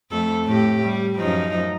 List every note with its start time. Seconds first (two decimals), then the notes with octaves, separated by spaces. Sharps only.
0.11 F2 A3 A4
0.45 A2 G4
0.84 G3
1.18 F#2 F3 D#4